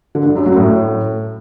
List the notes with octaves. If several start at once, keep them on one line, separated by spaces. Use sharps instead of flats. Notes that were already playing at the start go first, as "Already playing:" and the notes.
D3
G2
F#2
F#3
A2